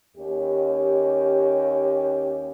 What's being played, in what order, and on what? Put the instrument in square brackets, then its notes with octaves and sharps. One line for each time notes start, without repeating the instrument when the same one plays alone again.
[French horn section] D#2 C#4 G4